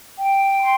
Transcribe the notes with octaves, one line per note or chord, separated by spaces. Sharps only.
G5
C6